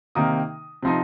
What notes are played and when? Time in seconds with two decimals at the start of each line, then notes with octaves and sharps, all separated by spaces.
0.15 C3 D#3 A#3 D#4 D#6
0.83 C3 F3 C4 D#4